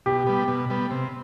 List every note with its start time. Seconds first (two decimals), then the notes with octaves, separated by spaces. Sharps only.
0.06 B2 G4
0.27 G3 B3
0.48 B2
0.70 G3 B3
0.91 C3